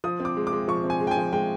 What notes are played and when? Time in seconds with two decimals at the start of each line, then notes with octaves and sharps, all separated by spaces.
0.04 F3 D#6
0.20 C4
0.25 D6
0.37 G#3
0.47 D6
0.53 G#3
0.68 F3 C#6
0.84 C4
0.90 G#5
1.01 G#3
1.07 G5
1.11 G#5
1.17 F3
1.33 G#3 G5